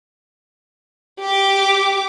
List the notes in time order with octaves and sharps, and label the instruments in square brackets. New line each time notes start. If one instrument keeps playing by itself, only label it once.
[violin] G4 D6